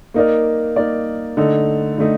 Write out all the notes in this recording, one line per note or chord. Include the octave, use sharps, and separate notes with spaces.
A#3 D#4 A#4 D5
A#3 D#4 A#4 D5
D3 A3 D#4 A4
D3 A3 D#4